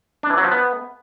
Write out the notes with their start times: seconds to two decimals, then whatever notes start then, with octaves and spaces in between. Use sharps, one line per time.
0.23 D4
0.30 E3
0.37 F#3
0.44 F3
0.51 B3